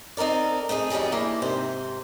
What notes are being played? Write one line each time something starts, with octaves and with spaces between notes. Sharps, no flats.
C4 D#4 A4 A#4 D5
A3 C4 D#4 G#4
F2 D#3 F#3 G3 G#4
E3 A#3 D4 E4 C5 E5
G#2 C3 C5